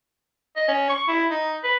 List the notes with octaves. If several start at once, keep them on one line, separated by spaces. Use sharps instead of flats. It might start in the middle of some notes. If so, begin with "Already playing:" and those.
D#5
C#4
C#6
E4
D#4
B4